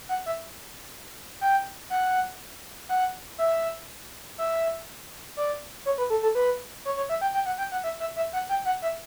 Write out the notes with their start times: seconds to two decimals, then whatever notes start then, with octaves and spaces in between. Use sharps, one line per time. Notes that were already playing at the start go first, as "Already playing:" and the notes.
0.09 F#5
0.26 E5
1.41 G5
1.90 F#5
2.89 F#5
3.38 E5
4.38 E5
5.37 D5
5.86 C#5
5.98 B4
6.10 A4
6.23 A4
6.35 B4
6.85 C#5
6.97 C#5
7.09 E5
7.21 G5
7.34 G5
7.46 F#5
7.58 G5
7.72 F#5
7.84 E5
8.00 E5
8.16 E5
8.33 F#5
8.49 G5
8.65 F#5
8.82 E5